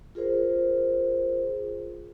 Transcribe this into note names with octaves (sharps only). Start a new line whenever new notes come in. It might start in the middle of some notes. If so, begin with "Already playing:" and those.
F4 G#4 A#4 C5